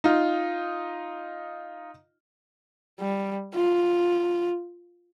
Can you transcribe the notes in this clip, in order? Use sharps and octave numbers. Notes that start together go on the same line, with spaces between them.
D#4 F4
G3
F4